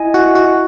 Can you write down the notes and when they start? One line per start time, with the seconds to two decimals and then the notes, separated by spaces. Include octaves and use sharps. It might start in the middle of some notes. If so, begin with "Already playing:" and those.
Already playing: E4 D#5 G#5
0.14 F#4
0.35 F#4